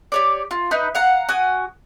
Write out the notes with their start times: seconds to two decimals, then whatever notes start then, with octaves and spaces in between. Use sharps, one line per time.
0.12 G4 C#5 D5
0.51 F4
0.71 D#4 B4 D#5
0.95 F5 F#5 A#5
1.29 F#4 G#5 D#6